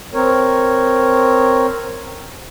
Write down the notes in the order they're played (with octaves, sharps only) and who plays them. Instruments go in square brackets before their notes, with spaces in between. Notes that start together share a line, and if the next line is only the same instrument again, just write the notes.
[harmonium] C4 A#4 C#5